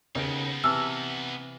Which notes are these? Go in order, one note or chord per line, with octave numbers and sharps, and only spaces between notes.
D#2 C#3 B3 D#4 D7
C3 E3 A5 E6 F6